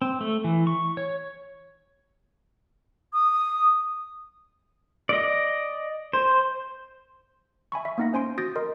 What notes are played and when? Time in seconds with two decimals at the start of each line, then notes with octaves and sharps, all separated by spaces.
0.02 C4
0.21 A3
0.44 E3
0.67 C#6
0.97 C#5
3.13 D#6
5.09 D5 D#5
6.13 C5
7.72 E5 G#5 B5 C#6
7.85 E5 C#6
7.98 A#3 B3 D#4 F#5 A#6
8.13 C#4 C5 G#5 C6 D7
8.38 F#4 D#6 G6 A6 A#6 D7
8.56 A#4 D#5 C6